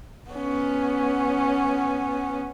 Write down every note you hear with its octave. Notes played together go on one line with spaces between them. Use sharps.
B3 C#4